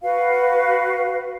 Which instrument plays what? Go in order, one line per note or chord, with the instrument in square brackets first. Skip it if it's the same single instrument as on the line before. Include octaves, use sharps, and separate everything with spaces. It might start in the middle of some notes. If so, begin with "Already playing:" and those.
[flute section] F#4 B4 F5